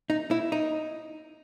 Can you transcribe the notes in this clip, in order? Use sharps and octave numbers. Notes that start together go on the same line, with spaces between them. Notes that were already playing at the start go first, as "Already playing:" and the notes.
D#4
E4
D#4